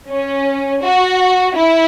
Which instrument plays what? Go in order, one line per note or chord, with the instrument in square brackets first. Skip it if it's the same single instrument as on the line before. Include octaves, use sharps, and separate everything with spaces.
[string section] C#4
F#4
E4